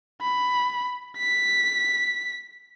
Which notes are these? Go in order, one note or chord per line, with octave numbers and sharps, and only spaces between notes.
B5
B6